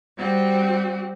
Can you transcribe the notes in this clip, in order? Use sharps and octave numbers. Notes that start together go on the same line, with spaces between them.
G3 C4 F#4 G4